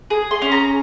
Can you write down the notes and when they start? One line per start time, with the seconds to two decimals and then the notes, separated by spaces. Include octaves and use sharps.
0.10 G#4
0.31 C6
0.42 C#4
0.52 A#5